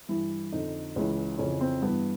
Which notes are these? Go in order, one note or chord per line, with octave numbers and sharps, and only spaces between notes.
G2 E3 E4
F2 D3 D#4
C#2 C#3 E3
F2 C#3 E3 C#4
C4
G2 E3 B3